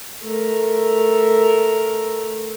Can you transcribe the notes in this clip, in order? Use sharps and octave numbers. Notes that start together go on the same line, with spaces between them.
A3 A#4